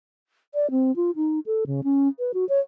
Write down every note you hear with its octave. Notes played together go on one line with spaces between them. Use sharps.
D5
C4
F4
D#4
A4
C#3
C#4
B4
F#4
C#5